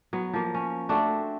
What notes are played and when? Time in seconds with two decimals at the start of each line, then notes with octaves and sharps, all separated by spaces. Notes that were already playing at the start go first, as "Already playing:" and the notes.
0.13 F#3 B3
0.33 F3 A#3
0.54 C#4
0.89 A3 C4 D4 F#4